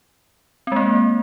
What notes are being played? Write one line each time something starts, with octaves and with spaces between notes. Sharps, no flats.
G#3 A#3 C4